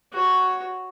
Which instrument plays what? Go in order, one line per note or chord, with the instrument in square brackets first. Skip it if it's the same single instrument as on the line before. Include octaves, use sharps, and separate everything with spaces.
[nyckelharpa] F#4 C#5